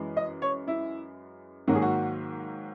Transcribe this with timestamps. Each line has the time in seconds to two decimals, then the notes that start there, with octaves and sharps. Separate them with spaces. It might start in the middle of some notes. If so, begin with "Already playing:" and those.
Already playing: F#2 E3 G#3
0.17 D#5
0.42 C#5
0.68 E4
1.67 G#2 D#3 F#3 A#3 F#4
1.75 G#4
1.82 F#4